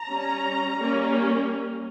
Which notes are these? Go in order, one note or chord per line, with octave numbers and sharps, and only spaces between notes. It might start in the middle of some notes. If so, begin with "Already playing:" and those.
Already playing: A#5
G3 C#4
G3 A#3 C#4